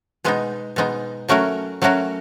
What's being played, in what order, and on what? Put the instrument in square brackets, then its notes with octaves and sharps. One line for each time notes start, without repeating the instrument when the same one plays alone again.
[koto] B2 G#3 B3 D#4
B2 G#3 B3 D#4
F#3 A3 C#4 F#4 A#4
F#3 A3 C#4 F#4 A#4